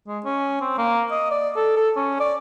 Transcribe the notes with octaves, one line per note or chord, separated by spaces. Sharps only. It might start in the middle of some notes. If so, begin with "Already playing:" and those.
G#3
C#4
C4
A#3
D#5
D5
A4
A4
C#4
D5